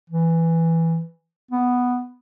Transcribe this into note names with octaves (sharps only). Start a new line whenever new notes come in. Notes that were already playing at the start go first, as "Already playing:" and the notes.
E3
B3